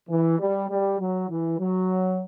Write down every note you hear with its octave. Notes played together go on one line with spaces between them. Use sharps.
E3
G3
G3
F#3
E3
F#3